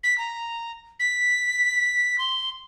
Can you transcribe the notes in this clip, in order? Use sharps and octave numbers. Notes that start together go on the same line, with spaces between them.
B6
A#5
B6
C6